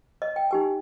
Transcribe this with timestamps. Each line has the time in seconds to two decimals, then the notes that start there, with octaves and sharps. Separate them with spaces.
0.22 D#5
0.36 G5
0.51 D#4 G4 G#5